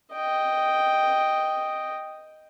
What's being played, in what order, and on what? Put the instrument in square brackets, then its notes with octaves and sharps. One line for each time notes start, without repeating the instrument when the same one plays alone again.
[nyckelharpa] D#5 G5